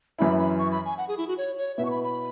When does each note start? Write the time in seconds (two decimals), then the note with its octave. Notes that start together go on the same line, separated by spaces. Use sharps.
0.19 F#2 E3 C#4 E4 B5
0.39 B5
0.59 C#6
0.72 B5
0.85 G#5
0.98 F#5
1.08 G#4
1.18 E4
1.28 F#4
1.38 C#5
1.58 C#5
1.78 B2 B3 E4 E5
1.85 C#6
1.91 B5
2.04 B5